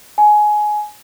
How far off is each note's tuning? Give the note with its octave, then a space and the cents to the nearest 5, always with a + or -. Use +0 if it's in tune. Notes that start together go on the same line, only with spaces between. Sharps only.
G#5 +15